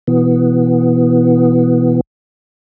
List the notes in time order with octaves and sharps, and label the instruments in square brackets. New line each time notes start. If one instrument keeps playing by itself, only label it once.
[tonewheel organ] B2 E3 B3